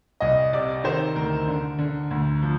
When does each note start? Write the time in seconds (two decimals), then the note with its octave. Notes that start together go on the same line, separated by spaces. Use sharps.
0.20 C2 D#5
0.53 C3 D5
0.84 D#3 C5
1.16 D2 A#4
1.47 D3
1.79 D3
2.11 D2
2.43 F3